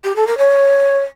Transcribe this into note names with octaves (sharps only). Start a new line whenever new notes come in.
G4
A4
A#4
C#5